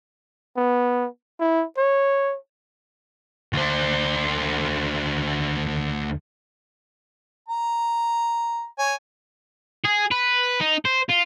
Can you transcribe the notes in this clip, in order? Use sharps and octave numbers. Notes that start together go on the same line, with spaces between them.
B3
E4
C#5
D2 C5
A#5
C#5 G#5
G#4
B4
D#4
C5
F4